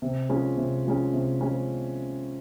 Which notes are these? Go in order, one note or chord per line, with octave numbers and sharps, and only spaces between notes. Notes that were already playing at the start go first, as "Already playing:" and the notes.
C3
F3 G#3 C#4
C3
F3 G#3 C#4
C3
F3 G#3 C#4